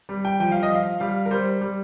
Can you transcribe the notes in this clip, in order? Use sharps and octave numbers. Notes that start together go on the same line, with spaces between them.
G3
G5
F3 G5
F5
D#5
F3 F5
G3 F5
A#4
G3 C5
G3